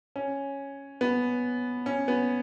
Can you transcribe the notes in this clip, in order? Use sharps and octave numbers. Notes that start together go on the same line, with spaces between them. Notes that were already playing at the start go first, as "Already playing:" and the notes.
C#4
B3
C#4
B3